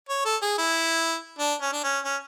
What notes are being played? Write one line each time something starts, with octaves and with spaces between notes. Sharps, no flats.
C#5
A4
G#4
E4
D4
C#4
D4
C#4
C#4